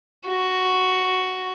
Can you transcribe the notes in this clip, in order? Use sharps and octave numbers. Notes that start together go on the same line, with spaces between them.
F#4